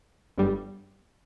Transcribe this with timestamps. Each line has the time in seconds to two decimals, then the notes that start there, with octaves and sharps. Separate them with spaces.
0.38 G1 G2 G3